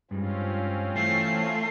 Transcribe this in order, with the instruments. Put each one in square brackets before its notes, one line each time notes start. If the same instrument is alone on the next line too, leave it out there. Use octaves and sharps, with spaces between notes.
[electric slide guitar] G2 G3 G#3 [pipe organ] C4 C#4 F4
[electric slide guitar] E3 [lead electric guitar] A3 [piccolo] C7